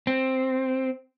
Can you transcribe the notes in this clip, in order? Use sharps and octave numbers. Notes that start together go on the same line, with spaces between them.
C4